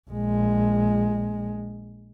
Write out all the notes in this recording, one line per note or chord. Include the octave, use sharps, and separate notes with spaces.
A#1 G#3